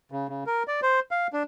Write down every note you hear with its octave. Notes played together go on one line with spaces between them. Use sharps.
C#3
C#3
A#4
D5
C5
F5
D4